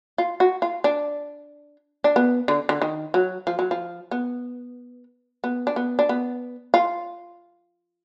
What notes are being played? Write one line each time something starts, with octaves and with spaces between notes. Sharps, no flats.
F4
F#4
F4
D4
D4
B3
D3
D3
D#3
F#3
F3
F#3
F3
B3
B3
D4
B3
D4
B3
F4